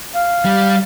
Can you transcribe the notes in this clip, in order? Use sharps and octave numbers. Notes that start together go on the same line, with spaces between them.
F5
G3